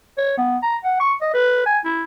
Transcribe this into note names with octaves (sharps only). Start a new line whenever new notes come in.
C#5
B3
A#5
F#5
C#6
D#5
B4
G#5
E4